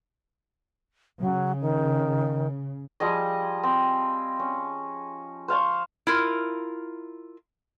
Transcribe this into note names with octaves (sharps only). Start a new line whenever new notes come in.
C#3 F#3
D#3
F3 G3 G#4 D#5
C4
C#4
C5 F5 A5 C#6
E4 F4 A#4